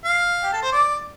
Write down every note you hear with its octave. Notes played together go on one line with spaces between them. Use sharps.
F5
G4
A4
C5
D5